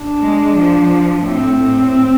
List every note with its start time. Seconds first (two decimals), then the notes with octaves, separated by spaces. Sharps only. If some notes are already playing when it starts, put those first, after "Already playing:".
Already playing: D4
0.19 G#3
0.54 F3
1.23 A2 C4
1.58 A2